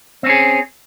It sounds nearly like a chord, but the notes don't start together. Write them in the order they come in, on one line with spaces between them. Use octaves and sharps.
C4 C#4 G#4